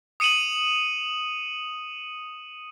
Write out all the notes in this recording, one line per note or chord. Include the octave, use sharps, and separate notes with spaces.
D#6 C#7 D#7 E7 F#7